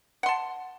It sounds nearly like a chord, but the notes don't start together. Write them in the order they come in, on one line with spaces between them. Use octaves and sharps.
F#5 C6 A5